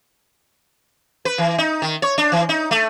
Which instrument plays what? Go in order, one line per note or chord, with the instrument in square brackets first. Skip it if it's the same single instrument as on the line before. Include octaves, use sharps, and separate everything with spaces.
[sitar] B4
E3
D#4
D#3
C#5
D4
E3
D#4
A3